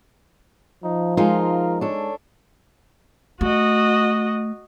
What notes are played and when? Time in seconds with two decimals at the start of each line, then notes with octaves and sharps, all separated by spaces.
0.84 F3 D#4
1.17 G#3 D#4 F4 A#4
1.81 D4 A4 C#5
3.41 A3 F#4 D#5